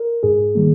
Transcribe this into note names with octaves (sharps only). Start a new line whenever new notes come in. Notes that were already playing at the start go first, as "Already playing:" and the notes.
Already playing: A#4
G#2 G#4
D#3 G3 A#3